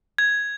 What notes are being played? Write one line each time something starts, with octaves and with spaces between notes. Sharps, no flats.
G#6